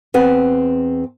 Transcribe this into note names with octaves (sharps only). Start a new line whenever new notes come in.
E2 C4 B4 F#5